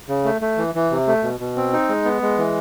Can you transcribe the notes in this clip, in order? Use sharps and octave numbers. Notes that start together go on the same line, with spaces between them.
C#3
A3
A3
E3
E3
C3
A3
B2
B2
C4
D#4
G#3
B3
G#3
E3